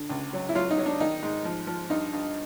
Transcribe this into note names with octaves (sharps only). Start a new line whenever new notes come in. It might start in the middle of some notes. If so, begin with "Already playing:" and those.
Already playing: D3
C#2
F#3
E4
F#3 F4
D#4
F#3
D4
D#3 D#4
G#2
F3
F3
G2 D#4
G2